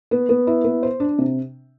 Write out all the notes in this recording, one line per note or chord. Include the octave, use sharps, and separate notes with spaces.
B3
B3
E4
B3
C5
D4
C3